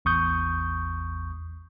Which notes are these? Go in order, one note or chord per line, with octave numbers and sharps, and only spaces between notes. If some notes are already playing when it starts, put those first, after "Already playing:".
A1 E2 C#6 D#6 G6